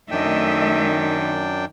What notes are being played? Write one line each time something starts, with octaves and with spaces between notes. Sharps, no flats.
F#2 D#3 A3 D4 D#5 E5 G5